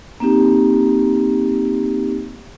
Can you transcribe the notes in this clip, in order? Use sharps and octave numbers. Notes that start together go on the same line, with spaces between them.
A#3 C4 D#4 G4